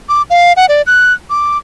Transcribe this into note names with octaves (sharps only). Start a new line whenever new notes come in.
D6
F5
F#5
D5
F#6
D6